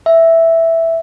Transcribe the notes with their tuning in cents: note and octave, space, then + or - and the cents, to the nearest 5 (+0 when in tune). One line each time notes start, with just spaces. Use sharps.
E5 +0